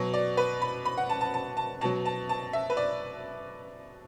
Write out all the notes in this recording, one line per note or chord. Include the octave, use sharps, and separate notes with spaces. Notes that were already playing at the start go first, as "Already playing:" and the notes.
Already playing: B2 F#3
D5
B4
B5
B5
F#5
A5
A5
A5
A5
B2 F#3 A5
A5
A5
E5
B4
D5